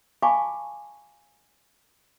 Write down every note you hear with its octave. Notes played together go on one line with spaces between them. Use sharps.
F5 G#5 A5 B5 C#6 D6